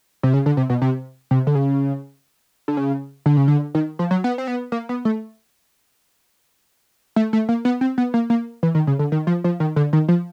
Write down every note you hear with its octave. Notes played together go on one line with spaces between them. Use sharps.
C3
C#3
D3
C3
B2
C3
C3
D3
C#3
D3
C#3
D3
C#3
D3
D#3
F3
F#3
B3
C4
B3
A#3
B3
A3
A3
A3
A#3
B3
C4
B3
A#3
A#3
E3
D#3
C#3
D3
D#3
F3
F3
D#3
D3
D#3
F3